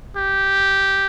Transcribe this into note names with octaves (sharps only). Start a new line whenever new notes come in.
G4